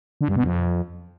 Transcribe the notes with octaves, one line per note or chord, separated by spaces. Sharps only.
D3
G2
B2
F2